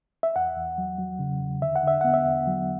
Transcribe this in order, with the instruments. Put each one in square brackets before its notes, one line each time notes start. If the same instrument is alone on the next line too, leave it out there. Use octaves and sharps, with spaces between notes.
[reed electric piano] E5
E2 F#5
E2
F#3
F#3
C#3
E2
D3 E5
F#5
D3 E5
B3 F#5
E5
E2
F#3